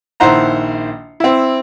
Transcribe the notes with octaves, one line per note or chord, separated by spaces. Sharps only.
A#1 D#3 E4 C5 F#5 A#5
C4 E4